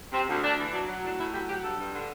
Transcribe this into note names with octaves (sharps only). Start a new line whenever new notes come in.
C3 C4
D2
D2 D4
E3
F#3 D4
F#3
A2 D4
A2 E4
F#3 G4
F#3 G4
G2 A4
G2
D3